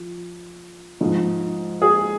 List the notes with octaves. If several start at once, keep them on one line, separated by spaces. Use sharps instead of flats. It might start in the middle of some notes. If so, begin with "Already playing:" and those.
Already playing: F3
G#2 F3 G#3
G#4